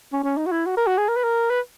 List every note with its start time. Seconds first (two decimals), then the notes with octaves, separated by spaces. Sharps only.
0.13 C#4
0.24 C#4
0.38 D#4
0.46 F#4
0.52 E4
0.66 F#4
0.77 A#4
0.87 F#4
0.98 G#4
1.09 A#4
1.17 B4
1.24 A#4
1.50 B4